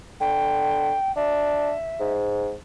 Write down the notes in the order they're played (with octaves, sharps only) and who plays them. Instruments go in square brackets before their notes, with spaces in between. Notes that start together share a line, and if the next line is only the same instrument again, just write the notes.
[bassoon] D3 [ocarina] G5
[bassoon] D4 [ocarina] E5
[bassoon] G#2